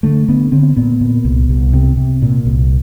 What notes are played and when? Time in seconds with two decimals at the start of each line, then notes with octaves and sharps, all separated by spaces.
0.03 D3 A3
0.28 D3 B3
0.52 D3 C4
0.76 A#2 B3
1.01 A#2
1.25 C2
1.49 C2
1.73 C3
1.97 C3
2.22 A#2
2.46 C2